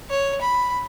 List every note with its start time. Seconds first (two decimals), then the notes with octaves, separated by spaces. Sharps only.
0.10 C#5
0.41 B5